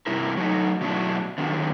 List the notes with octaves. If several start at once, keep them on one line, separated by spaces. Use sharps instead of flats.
G2 C3 E4 A#4
F#3 A3 D#4
B2 D3 F#3 A3 D4 E4
D3 D#3 F#3 B3